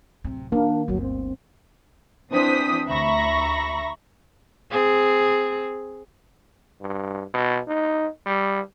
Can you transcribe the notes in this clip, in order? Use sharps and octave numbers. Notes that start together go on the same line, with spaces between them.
D1 C3
D#3 A#3 D4
G1 D2 F#3
C4
E3 C4 D4 C5 D#6 B6
D2 E5 A#5 B5 C#6 A#6
C4 G#4
G2
B2
D#4
G3